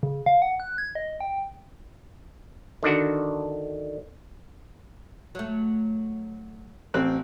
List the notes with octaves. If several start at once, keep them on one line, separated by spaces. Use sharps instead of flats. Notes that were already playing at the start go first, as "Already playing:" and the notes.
C#3
F5
F#5
F#6
G#6
D#5
G5
D3 D#3 D4 F#4
F#3 A3
A1 C4 F#6